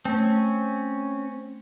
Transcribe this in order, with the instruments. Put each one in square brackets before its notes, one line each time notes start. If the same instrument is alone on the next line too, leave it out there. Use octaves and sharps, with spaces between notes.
[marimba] A3 [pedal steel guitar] C4 C#4